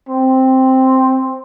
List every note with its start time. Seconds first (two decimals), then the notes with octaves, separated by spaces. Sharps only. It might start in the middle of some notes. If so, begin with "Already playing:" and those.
0.09 C4